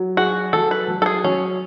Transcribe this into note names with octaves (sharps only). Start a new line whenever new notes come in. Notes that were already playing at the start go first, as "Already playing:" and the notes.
Already playing: F#3
F#4 G#4
F#3 A4
B4
F#3
A4
G#4
F#3 C#4